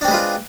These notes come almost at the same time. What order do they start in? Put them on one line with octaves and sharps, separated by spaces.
D4 C4 G#3 B4 F4